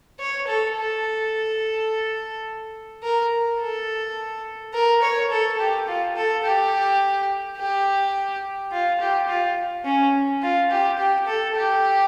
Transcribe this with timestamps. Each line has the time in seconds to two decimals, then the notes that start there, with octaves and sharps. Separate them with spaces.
0.20 C#5
0.47 A4
0.77 A4
3.03 A#4
3.60 A4
4.73 A#4
5.02 C#5
5.30 A4
5.59 G4
5.88 F4
6.16 A4
6.44 G4
7.57 G4
8.72 F4
9.00 G4
9.28 F4
9.85 C#4
10.43 F4
10.71 G4
10.98 G4
11.27 A4
11.56 G4